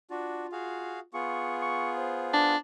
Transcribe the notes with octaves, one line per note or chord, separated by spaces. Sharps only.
D4 F4 F#4
F#4 G#4 F5
B3 F4 G#4 C#6
C#6
C5
D4